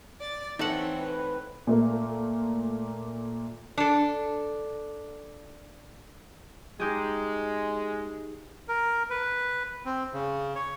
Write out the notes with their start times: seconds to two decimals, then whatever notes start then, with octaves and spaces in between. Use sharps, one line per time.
0.20 D5 A6
0.59 E3 A3 C4 D#4 A4 C#5 F#5
0.99 B4
1.67 A#2 A3 A#3
3.78 D4 A4
6.80 G#3 D#4 G4 G#4
8.68 A#4
9.10 B4
9.85 C4
10.13 C#3
10.55 C#5